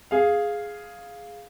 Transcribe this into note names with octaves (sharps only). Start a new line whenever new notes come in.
G#4 F5